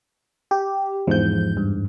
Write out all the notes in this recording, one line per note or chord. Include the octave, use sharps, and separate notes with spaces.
G4
E2 G#2 F3 G6
G2